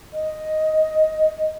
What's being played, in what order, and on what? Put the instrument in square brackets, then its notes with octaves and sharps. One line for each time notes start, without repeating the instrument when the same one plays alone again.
[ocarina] D#5